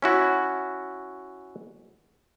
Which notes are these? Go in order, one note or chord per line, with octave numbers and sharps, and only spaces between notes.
C#4 E4 F#4